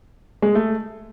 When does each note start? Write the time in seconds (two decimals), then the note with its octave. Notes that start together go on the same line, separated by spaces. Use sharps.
0.42 G#3
0.55 A3